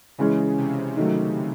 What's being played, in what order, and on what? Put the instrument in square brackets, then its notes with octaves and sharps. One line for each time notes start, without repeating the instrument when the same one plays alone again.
[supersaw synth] C#3 [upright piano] E3 G#3 C#4
[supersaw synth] C3
[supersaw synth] C3 [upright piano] D#3 F#3 A3